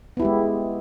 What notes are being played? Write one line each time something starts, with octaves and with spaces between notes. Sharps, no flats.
G#3 B3 E4 G4